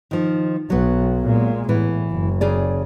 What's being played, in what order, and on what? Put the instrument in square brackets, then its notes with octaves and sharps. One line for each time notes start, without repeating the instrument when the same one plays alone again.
[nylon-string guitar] D#3 F3
[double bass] B1 [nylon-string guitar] F#3 B3
[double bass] A#2 G#3
[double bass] A2 [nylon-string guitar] E3 B3
[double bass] F#1
[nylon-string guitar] C#3 G#4 D5